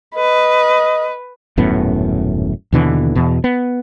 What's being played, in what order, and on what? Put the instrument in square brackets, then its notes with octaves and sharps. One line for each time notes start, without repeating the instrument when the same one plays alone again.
[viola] B4 [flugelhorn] D#5
[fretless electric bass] D#1 F#2 A2 B3
D#2 B2 D3 E3
E2 B2
B3